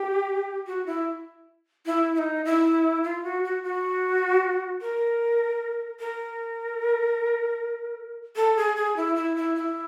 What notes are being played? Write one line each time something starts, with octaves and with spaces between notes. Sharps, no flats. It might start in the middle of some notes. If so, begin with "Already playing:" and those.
Already playing: G4
F#4
E4
E4
E4
D#4
E4
F4
F#4
F#4
F#4
A#4
A#4
A4
G#4
G#4
E4
E4
E4
E4